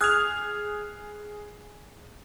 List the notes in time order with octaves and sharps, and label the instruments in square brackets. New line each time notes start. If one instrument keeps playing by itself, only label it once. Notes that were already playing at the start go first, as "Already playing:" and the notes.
[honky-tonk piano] G#4 G#6 F7 [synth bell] D#6 F6 F#6